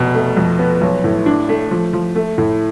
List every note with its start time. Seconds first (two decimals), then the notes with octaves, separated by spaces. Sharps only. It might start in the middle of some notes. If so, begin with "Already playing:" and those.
Already playing: F1 B2
0.15 A3
0.37 F2
0.59 B3
0.81 B1
1.04 A2
1.26 D4
1.49 A3
1.71 F3
1.93 F3
2.15 A3
2.38 A2